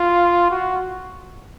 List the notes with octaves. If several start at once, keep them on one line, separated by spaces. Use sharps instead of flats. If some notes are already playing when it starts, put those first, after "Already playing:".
Already playing: F4
F#4